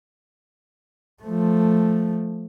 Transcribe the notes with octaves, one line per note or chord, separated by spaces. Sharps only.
F3 A3